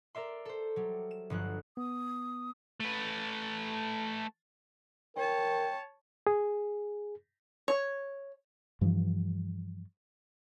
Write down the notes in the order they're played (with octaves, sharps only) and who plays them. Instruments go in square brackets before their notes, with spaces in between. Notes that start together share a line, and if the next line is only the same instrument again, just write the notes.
[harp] A#4 D5 E5 C6
A4 C5
F#3 G3
E7
G1 F3 F#3 F#6
[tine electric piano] B3 [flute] D#6
[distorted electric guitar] A3 B4
[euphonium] A#4 [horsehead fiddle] C#5 A5 [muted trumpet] G5
[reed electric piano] G#4
[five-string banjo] C#5
[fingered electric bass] G2 E3 F3